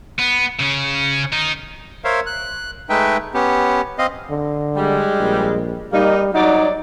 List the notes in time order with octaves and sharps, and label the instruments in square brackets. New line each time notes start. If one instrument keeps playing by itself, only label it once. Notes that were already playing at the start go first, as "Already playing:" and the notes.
[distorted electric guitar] B3
C#3 C#4
D#3 D#4
[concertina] A#4 C5 C#5 E5 F5
F#6
G#3 A3 D#4 B4 E5 G5
B3 C#4 G4
C4 D#5 F5
[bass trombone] D3
[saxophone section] G3 G#3
[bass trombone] A#1
[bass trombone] G3 [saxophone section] A#3 D#4
[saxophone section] F#3 D5 [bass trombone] D#4